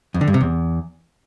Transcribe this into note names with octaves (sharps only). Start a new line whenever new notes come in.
F2
D3
G2
C3
E2